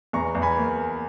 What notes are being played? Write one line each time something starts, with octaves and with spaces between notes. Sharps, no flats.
E2 A#5 C#6
E2
G#5 B5
A#3